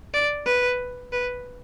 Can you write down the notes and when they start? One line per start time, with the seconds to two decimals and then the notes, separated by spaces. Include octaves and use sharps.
0.14 D5
0.46 B4
1.12 B4